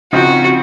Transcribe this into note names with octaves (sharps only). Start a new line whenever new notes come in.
C#3 F3 C4 D#4 F#4